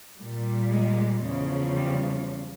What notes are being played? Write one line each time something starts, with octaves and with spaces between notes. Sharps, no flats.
A#2 G3
G#3
E2 C#3 F3
G3